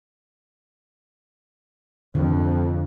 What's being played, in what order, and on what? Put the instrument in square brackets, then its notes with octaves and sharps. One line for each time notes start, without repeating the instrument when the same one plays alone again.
[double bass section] F2 [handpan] D3